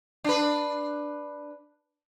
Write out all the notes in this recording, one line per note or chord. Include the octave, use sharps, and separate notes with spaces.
D4 B4